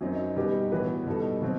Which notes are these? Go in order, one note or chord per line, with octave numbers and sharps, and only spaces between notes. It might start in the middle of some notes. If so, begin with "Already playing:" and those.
F#2 F#3 C4 D#4
B2 G3 D#4 G4 B4
A2 E3 B3 F#4 B4
B2 G3 D#4 A4
B2 F#3 C4